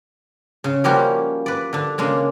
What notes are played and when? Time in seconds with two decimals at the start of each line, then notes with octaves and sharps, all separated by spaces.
0.64 C#3
0.84 F3 G3 A#3 C#4 F#4 G4
1.46 B4 D5
1.73 D3 D4
1.98 C#3 G#3 A#3 D4